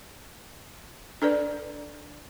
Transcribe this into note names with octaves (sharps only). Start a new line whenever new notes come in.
D4 A4 B4 D5